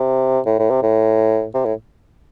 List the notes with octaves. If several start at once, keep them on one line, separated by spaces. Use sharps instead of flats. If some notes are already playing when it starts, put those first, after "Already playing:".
Already playing: C3
A2
A2
C3
A2
C3
A2